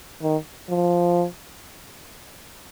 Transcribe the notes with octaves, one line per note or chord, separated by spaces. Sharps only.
D#3
F3